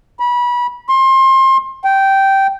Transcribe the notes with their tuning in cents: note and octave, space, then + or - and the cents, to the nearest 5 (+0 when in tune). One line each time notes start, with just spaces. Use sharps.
B5 -25
C6 +30
G5 -10